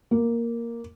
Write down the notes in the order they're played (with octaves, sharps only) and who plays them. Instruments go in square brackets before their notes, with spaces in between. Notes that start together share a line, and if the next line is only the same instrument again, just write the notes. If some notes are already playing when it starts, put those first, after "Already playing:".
[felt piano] A#3